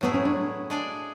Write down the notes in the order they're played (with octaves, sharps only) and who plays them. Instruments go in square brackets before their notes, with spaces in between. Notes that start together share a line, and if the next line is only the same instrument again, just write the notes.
[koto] A2 F#3 A3 E4 G#4 [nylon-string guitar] B3
[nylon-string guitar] C#4
D4
[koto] G#3 D4 G#4 D5